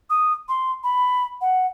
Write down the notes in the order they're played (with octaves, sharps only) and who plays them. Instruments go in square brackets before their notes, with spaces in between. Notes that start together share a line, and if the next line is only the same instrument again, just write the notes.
[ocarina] D#6
C6
B5
F#5